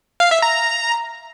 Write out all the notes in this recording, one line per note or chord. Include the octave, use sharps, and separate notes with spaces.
F5
E5
A#5